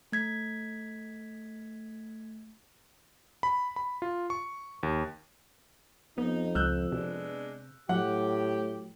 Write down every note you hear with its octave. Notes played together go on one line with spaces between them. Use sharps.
A3 G#6 B6
B5
B5
F4
C#6
D#2
F2 B3 D#4
C#2 E6 F#6 G6
C3 G#3 B3 D4
A2 F#3 G4 F#5